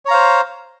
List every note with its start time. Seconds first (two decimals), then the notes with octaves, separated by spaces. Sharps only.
0.05 C#5
0.08 A#5
0.11 F5
0.14 C5